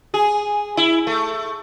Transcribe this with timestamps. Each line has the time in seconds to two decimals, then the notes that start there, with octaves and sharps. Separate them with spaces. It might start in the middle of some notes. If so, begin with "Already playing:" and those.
0.14 G#4
0.77 E4
1.07 A3